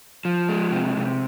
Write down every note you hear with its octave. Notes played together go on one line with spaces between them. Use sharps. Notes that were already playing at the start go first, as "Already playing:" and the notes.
F3
G#3
C3
C3